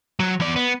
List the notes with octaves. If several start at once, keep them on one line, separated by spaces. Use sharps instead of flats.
F#3
E2 D5
B3